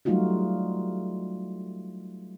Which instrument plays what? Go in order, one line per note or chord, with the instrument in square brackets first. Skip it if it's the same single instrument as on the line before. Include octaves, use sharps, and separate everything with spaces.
[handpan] F#3 G3 A3 D#4 F4 F#4